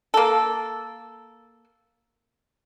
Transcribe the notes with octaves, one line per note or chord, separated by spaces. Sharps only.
A#3 A4